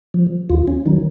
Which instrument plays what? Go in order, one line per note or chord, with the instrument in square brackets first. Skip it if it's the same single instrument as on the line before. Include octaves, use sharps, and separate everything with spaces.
[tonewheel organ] F3
D#2 F4
C#4
D#3 F#3 D#4